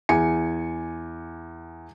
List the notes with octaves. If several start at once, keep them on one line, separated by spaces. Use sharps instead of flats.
E2 G#5 C#7